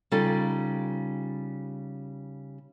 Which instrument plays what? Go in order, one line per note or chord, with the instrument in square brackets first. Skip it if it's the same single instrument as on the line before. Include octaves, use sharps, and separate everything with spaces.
[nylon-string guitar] C#3 G3 D#4 F4 A4